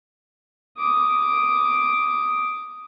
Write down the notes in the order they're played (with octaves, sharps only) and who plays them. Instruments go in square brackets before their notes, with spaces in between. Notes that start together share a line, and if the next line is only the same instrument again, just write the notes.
[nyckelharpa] D6 D#6